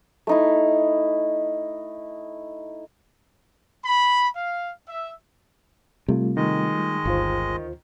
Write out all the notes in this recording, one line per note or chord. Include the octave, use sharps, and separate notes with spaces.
A3 D#4 E4
B5
F5
E5
C3 G3 A3 F4
D#3 G#3 D#5
G1 D2 F4 C5